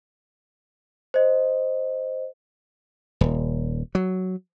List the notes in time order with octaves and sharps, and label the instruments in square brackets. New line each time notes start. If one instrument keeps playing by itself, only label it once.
[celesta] C5 D#5
[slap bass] D#1
F#3